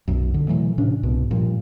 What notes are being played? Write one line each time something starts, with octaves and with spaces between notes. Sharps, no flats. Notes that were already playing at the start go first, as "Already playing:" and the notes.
B1 F#2
D3
B2 E3 F#3 A3
A2 C3 C#4 D4
C2 G#2 B2
G2 A#2 F3